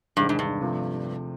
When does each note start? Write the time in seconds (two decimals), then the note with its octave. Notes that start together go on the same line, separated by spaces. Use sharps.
0.17 E2 G2 C3 D#3 G#3 C4
0.29 G#2
0.39 G2
0.61 C3 F3 A3